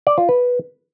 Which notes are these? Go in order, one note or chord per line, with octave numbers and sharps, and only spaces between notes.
D5
F4
B4